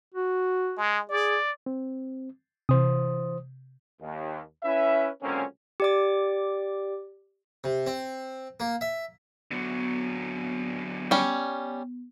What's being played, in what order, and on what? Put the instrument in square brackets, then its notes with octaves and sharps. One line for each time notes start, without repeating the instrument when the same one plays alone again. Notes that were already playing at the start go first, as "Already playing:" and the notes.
[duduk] F#4
[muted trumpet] G#3
[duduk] G#4 [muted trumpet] D5
[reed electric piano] C4
[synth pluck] C3 [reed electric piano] E3 C5 D#6
[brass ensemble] D#2
C#4 E4 B4 E5
C#2 D3 F#3 A#3 C4 C#4
[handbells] G4 D5 D6
[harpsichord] C3
C4
A#3
E5
[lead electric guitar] D3 F#3 [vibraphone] B3
[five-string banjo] G3 C#4